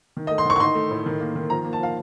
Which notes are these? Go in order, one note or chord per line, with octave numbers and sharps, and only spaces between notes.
D#3
D#5
A3
C6
D#3 C#6
C#6
D#4 C6
A3
A2
D#3
A#3
D#3
F3 A#5
A#3
A5
F3 F5